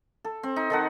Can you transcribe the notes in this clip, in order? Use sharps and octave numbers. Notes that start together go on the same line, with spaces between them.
A4
C4
D#4
D#3 A4 F#5